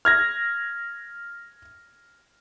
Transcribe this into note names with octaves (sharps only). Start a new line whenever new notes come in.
F6 G#6 A#6